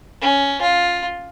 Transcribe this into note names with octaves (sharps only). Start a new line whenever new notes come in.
C#4
F4